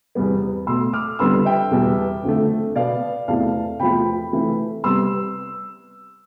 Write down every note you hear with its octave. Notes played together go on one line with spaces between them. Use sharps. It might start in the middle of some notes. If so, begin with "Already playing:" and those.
E2 C3 G3 B3
B2 A3 C6 E6
D6 F6
F2 D3 G3 B3 C6 E6
E5 G5
E2 B2 G3 B3
F2 D3 A3
B2 B3 D5 F5
E2 C3 E3 A3 F5 A5
E2 C3 F3 A3 G5 B5
C3 E3 A3
C3 G3 B3 C6 E6